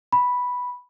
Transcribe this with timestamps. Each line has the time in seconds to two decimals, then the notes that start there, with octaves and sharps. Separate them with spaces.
0.12 B5